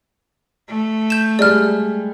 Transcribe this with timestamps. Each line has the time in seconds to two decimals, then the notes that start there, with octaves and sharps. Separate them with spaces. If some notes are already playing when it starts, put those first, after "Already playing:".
0.69 A3
1.10 G6 E7
1.39 G3 G#3 D5 F6